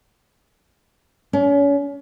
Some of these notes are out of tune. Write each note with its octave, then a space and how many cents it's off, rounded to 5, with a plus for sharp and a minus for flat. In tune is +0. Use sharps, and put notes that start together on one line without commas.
C#4 +35